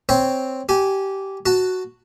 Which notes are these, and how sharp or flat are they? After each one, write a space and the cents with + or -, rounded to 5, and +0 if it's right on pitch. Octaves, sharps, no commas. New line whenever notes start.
C4 +0 C#5 +0 G5 +0
G4 -15 G#5 +0
F#4 +0 A5 +10